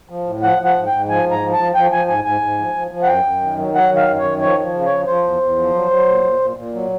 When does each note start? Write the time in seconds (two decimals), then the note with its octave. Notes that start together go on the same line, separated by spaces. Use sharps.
0.09 F3
0.26 A2
0.42 F3 F#5
0.58 F3
0.65 F#5
0.76 G#2
0.87 G5
0.92 G#2
1.08 F3 G#5
1.26 G#2
1.31 A#5
1.41 F3
1.53 A5
1.58 F3
1.75 F3 G5
1.92 F3 G#5
2.08 G#2 G#5
2.25 G#2 G#5
2.41 G#2
2.59 F3
2.75 F3
2.91 F3
3.03 F#5
3.08 F#2 G5
3.25 F#2
3.41 D#3
3.59 F#3
3.74 F#3 F#5
3.91 D#3
3.96 F5
4.08 F#2
4.19 C#5
4.24 D#3
4.41 F3 C#5
4.58 F3
4.74 C#3
4.86 F3 C#5
5.07 F3 C5
5.24 E2
5.41 E2
5.57 F3
5.74 F#3
5.90 F#3
6.07 A#2
6.24 A#2
6.40 A#2
6.57 A#2
6.74 F#3